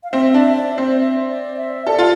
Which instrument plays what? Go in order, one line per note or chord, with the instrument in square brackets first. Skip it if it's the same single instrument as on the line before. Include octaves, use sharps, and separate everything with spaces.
[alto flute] F5
[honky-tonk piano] C4 [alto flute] E5
[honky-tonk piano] D4 [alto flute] E5
[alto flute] D5
[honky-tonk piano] C4 [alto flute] C5
[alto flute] E5
D5
E5
[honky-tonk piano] A4 [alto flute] D5
[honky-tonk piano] F4